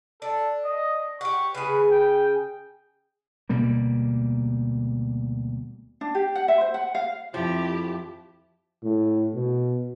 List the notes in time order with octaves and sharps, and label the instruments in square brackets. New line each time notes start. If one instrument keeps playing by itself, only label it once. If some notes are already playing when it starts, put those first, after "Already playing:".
[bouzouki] D4 [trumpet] A4
[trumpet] D#5
[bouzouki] G4 F#5 [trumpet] C#6
[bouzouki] C#3 G#4 [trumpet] B4
[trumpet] G5
[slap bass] D2 B2 G3 A#3
[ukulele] D4
G4
F#5
E5
C5
F#5
F5
[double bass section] F2 [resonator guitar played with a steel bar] F3 [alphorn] E4 [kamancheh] G4
[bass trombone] A2
B2